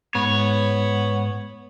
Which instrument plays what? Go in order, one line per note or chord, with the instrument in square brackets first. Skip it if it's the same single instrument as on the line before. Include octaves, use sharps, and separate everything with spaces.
[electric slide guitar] G#2 [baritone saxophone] B3 [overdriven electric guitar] C#5